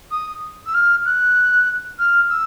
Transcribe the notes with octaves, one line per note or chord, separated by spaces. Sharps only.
D#6
E6
F6
F#6
F6
E6